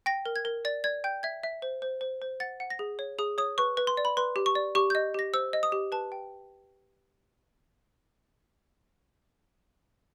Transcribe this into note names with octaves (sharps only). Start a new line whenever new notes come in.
G5 A#6
A#4
G#6
A#4
D5 A6
D5 G#6
G5 G6
E5 G#6
E5
C5
C5
C5
C5
F#5 A6
F#5
A#6
G#4
C#5
G#4 D#6
C#5 D#6
B4 C#6
B4
C6
D5
B5
B4 C6
G4
C#6
D5
G4 C#6
D#5 G6
G4 A#6
C5 E6
D#5
D#6
G4
B4 A5
G5